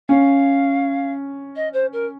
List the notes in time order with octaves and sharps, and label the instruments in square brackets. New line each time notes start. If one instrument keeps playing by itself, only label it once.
[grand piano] C#4 [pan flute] F5
[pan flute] D#5
C5
A#4